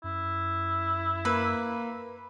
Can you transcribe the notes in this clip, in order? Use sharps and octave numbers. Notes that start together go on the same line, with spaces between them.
F#2 E4
A#3 B4